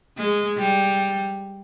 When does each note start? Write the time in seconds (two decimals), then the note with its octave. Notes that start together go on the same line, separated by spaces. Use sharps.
0.18 G#3
0.58 G3